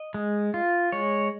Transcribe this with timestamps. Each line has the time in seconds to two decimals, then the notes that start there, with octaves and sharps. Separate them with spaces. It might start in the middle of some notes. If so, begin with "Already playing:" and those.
Already playing: D#5
0.14 G#3
0.54 F4
0.92 G#3 C#5